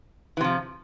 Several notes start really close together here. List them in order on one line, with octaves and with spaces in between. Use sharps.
E3 C3 F3